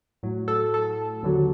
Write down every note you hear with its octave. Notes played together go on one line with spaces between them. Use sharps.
A2 F#3
A4
A4
D#2 D3 F#3